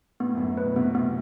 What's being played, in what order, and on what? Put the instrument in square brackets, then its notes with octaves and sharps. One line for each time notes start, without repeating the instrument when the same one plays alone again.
[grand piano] A2 [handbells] B3
[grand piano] F#2 [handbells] B3
[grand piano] A2
[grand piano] B2 [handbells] B4
[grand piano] C3 [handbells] B3
[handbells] B3